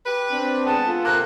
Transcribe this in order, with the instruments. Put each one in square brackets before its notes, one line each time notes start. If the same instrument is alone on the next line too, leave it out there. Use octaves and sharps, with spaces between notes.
[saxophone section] G4 B4
[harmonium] C4 D4
[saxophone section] G#3 B3 [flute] A5
[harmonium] F4 A4
[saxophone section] C3 A#3 [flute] F#6